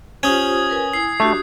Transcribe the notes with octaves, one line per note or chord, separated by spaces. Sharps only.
C#4 F4 G4 C5 D#6 G#6
A#4 B4 G#5
E4 G#5 C7
A3 D4 F#4 G4